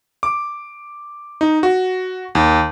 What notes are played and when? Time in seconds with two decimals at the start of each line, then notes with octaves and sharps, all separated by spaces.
0.23 D6
1.41 D#4
1.63 F#4
2.35 D#2